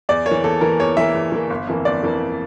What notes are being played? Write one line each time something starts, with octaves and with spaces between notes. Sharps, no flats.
E2 D5
A#3 C#5
E3
E2 A4
E3 A#3 A#4
E2 C#5
E3 A#3 E5
E2
E3 A#3
G1
F2 E3 A#3
G1 D5
F2 E3 A#3